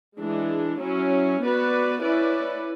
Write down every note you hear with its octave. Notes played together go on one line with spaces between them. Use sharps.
E3 G#3 D4
F#3 C#4 E4
B3 F#4 B4 D5
C#4 E4 B4 D5